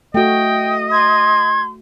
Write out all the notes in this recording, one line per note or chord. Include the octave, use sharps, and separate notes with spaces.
A3 F#4 D#5 G5
C6 G#6